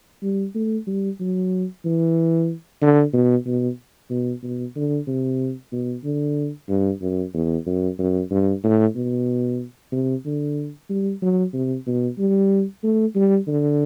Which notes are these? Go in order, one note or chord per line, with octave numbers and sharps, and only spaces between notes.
G3
A3
G3
F#3
E3
D3
B2
B2
B2
B2
D3
C3
B2
D3
G2
F#2
E2
F#2
F#2
G2
A2
B2
C3
D3
G3
F#3
C3
B2
G3
A3
G3
D3